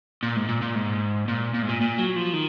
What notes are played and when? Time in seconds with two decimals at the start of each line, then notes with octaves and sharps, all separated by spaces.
0.23 A#2
0.36 G#2
0.48 A#2
0.62 A#2
0.75 G#2
1.28 A#2
1.54 A#2
1.62 G#2
1.69 A#2
1.81 A#2
1.98 F#3
2.16 F3
2.33 D#3